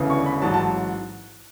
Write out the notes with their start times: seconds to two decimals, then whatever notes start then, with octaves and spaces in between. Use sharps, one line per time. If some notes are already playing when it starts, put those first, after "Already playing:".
Already playing: E1 D2 C#3 E3
0.10 C#6
0.26 B5
0.42 A1 G#2 F#3 A5
0.54 A5